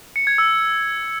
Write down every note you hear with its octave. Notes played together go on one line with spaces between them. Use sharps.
C#7
G#6
E6